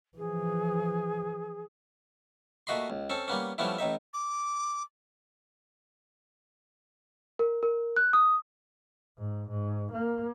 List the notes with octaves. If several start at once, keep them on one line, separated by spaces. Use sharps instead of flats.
E3 F3 G#4
A#2 A3 F#4 D#5 B5 C6
C#2
C4 C#4 A4
G3 A#3 B3 C#4
F3 G3 A3 B3 C#4 E4
A1 A2 D#4 E5
D6
A#4
A#4
F#6
D#6
G#2
G#2
A#3